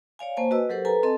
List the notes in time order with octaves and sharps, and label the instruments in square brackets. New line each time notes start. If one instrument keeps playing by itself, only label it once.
[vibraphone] C#5 D5 F5 G#5
A#3 C5 G#5 A5
F#4 B4 D#5 E6
F#3 G4 A4 A#4 C5 F#5
A4 B4 G#5 A#5
C4 A4 D#5 A5